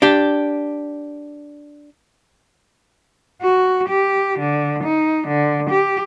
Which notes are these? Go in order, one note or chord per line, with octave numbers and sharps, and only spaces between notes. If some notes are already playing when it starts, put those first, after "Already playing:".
D4 G4
F#4
G4
D3
D#4
D3
G4